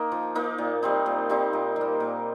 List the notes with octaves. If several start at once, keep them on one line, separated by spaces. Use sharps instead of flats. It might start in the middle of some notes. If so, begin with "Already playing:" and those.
Already playing: A#3 D#4
F3
A#3 D#4
A#2
G3 C4 D#4
A#2
G3 C4 D#4
A#2
G3 A#3
A#2